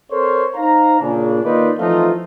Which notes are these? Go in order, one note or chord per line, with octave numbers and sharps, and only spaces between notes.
C4 A4 A#4 C5 C#5
D#4 C5 F5 A#5
A#2 C#3 D4
D#3 A#3 D#4 F4 B4 D5
E3 F3 A3 C4 D#4 F4